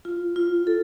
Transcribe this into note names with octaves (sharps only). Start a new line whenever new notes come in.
F4
F4
A4